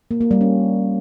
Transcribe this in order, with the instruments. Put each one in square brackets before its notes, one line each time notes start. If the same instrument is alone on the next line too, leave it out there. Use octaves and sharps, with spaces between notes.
[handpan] A#3
A#3
G3
C#4